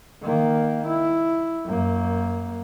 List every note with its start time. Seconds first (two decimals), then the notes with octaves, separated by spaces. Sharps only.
0.23 D#3 A#3
0.88 E4
1.66 F#2 A#3